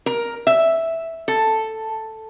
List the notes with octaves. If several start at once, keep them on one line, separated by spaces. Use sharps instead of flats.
A#4
E5
A4